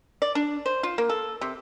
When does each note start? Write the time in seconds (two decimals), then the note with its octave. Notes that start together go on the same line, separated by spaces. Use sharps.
0.22 D5
0.35 D4
0.66 C5
0.83 F4
0.98 A#3
1.09 A4
1.41 C3